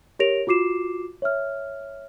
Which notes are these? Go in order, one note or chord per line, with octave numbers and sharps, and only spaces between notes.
G4 A#4 C#5 A#6 D7 F7
F4 F#4 D6 C7 E7
C#5 E5 F6